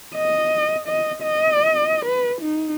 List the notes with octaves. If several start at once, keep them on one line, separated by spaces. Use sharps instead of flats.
D#5
D#5
D#5
B4
D#4